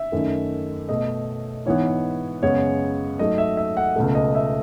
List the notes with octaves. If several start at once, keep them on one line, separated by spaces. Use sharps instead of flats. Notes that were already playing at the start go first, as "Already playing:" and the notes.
Already playing: E5
F#2 D#3 A3
B2 A3 D#5
G#2 E3 B3 C#5
F#2 C#3 G#3 B3 C#5
G#2 F#3 A3 D#5
E5
E5
F#5
C#2 B2 A3
D#5
E5